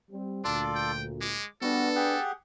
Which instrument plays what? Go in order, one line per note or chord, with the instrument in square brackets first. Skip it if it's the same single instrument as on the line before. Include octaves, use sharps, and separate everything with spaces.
[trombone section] G3 C4
[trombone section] D2 A#2 [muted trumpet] D4 [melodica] F4 A4 D5
[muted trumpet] G5
[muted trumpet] G#3 [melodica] D6
[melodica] G3 F#4 [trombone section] B3 D4 [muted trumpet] A4
[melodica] G4 G#4 F#5